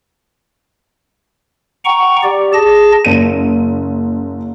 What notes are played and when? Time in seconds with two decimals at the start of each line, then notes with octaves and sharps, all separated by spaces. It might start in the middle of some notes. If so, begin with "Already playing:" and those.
1.85 F#5 G5 A#5 C#6
2.23 G4 D5
2.53 G#4 A5 A#6
3.05 F#1 D#7